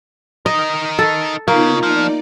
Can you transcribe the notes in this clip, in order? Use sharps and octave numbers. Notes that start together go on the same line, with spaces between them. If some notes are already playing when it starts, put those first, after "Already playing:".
D#4 A#4 D#5
A4
C#3 A#3 B3 D#4 F4
F3 D#4 D5